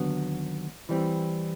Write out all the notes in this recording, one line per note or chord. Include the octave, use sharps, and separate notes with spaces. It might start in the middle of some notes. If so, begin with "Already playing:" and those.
Already playing: D#2 D3 F#3 B3
E3 G3 C4